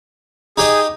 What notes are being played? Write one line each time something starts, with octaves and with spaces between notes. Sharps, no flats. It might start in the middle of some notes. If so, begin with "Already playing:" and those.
D#4 G4 G#4 D#5